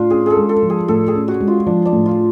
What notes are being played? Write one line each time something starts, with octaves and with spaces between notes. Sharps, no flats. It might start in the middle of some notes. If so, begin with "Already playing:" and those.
Already playing: A2 D4 F4
C#4 G#4
G#4 A4
G#3
A4
F3
G#4
A2 A4
G#4
C#4
F#4
G#3
F4
F3 D4
D4
A2
F4